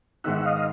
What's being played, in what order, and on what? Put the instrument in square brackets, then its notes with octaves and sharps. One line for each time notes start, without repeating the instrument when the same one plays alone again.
[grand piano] G#2 D#3 G#3 B3 D#4 [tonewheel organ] E5 F#5
[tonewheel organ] D#5 F5